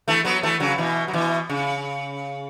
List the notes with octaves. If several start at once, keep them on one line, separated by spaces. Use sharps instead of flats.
E3 A3
F#3 B3
E3 A3
C#3 F#3
B2 E3
F#3
B2 E3
C#3